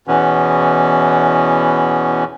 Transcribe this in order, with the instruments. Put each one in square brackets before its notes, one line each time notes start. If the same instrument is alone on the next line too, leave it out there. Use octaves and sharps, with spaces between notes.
[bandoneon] E2 B2 E3 B3 C#4